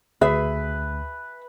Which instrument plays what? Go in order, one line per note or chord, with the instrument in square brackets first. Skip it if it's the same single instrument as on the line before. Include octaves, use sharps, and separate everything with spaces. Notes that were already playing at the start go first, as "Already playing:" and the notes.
[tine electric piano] D2 [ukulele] G#4 E5 [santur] B4